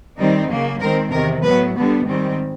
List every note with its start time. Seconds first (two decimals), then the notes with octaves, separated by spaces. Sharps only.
0.17 D#3 G3 C4 D#4
0.49 C#3 F#3 A#3
0.80 D#3 G#3 C4 A#4
1.12 E2 C3 D#3 A#4
1.43 A2 F#3 B3 B4
1.74 D3 G3 B3
2.06 G#2 D#3 G3 C4